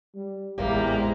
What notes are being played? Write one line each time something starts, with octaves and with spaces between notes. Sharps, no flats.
G3
A1 E2 G#2 C3 G3 G#3 A#3 A#5